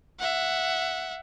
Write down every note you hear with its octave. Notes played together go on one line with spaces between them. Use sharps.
E5 F#5